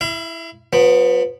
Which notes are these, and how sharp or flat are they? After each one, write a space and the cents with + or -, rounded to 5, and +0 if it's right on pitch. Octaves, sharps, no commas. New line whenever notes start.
E4 +0 F5 -45
F3 +45 B3 +0